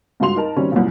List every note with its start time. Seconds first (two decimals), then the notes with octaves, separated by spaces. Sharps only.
0.20 C#2 G2 F#4 C6 F7
0.36 D#4 A#4 A5
0.56 D#3 G3 C4 C#4 F#4
0.72 C2 F#2 A#2